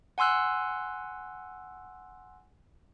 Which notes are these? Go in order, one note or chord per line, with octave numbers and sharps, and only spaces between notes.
F#5 G#5 C6 E6 F#6